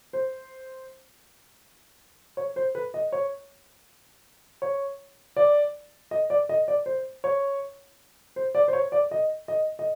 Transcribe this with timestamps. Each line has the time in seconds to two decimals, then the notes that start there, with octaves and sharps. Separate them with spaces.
0.13 C5
2.37 C#5
2.56 C5
2.75 B4
2.94 D#5
3.12 C#5
4.62 C#5
5.36 D5
6.11 D#5
6.30 D5
6.49 D#5
6.68 D5
6.86 C5
7.24 C#5
8.36 C5
8.55 D5
8.68 C5
8.73 C#5
8.92 D5
9.11 D#5
9.48 D#5
9.79 D#5